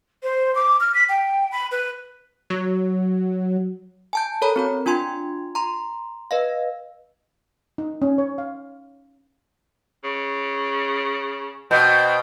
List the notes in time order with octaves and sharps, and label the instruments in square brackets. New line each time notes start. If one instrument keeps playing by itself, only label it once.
[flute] C5
D6
F6
B6
G5
B5
B4
[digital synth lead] F#3
[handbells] G#5 A5 G6
A4 A#4 C#5 A#5 B5
C4 F#4 B5
D4 F4 G#5 C6 G#6
A#5 C6
B4 D#5 F5
[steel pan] D#4
C#4
C#5
F5
[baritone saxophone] C#3
[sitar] B2 [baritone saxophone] C4 [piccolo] G6